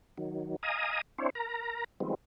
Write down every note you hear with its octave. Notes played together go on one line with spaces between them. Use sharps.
D#3 F#3
D#5 F5 G#5 A#5 D#6
C4 D4 E4 C5 C#5
A#4 A#5
D#3 F3 G3 G#3 B3 C4